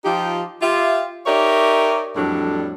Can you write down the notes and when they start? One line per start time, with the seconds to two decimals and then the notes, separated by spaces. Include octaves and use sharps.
0.04 F3 D#4 F4 G4
0.62 F4 G4 E5
1.26 D#4 G4 A#4 C#5 D5 E5
2.16 F2 A2 F#3 G3 D4 A4